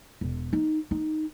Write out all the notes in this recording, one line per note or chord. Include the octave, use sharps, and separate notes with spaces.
E1
D#4
D#4